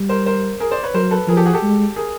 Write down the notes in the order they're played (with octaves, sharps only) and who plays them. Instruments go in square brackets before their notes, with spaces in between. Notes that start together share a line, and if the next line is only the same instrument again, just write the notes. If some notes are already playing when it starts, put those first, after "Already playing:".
Already playing: [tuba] G3
[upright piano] A#4 C5
A#4 C5
G#4 A#4
C5 D5
B4 C#5
[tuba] F#3 [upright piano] A#4 C5
[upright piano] A4 B4
[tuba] F3 [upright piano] G#4 A#4
[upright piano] G4 A4
F#4 G#4
G4 A4
[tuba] G#3
[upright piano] G#4 A#4